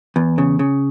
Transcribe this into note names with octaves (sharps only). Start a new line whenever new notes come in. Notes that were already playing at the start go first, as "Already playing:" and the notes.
E2
C#3
C#3